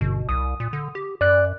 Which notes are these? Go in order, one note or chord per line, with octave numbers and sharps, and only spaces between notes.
G1 B2
C2 D#6
A#2
D3
G4
F#2 D5 F#6